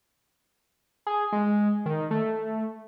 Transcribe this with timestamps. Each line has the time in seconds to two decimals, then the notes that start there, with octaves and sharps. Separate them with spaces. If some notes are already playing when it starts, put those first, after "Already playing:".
1.07 G#4
1.32 G#3
1.86 D#3
2.11 A3